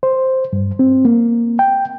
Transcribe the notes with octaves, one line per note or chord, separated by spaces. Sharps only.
C5
G2
C4
A#3
G5